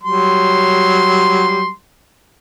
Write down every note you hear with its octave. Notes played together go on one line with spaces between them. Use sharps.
F#3 G3 C6